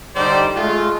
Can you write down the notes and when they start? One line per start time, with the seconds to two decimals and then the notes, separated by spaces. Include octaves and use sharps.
0.15 D3 G3 D#4 G4 C5 D5
0.56 G#3 A3 F4